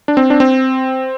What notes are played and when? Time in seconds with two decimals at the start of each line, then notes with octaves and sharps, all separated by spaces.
0.08 D4
0.17 C4
0.30 D4
0.40 C4